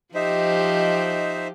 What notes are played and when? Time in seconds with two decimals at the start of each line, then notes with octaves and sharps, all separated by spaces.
0.14 F3 D#4 G4 C5 D#5 E5